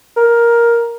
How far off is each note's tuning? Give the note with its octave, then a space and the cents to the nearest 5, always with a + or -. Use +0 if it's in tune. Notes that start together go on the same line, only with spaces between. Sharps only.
A#4 +10